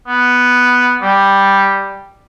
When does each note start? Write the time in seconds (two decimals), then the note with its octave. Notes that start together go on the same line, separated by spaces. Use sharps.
0.07 B3
1.02 G3